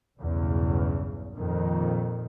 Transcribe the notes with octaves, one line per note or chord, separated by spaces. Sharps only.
B1 E2 G2 C#3
F2 A#2 D#3